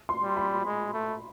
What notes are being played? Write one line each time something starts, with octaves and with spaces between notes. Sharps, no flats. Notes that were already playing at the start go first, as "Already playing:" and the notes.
C6
G3
B5
G#3
A3